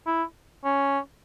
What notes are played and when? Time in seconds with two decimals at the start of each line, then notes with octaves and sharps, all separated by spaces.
0.06 E4
0.64 C#4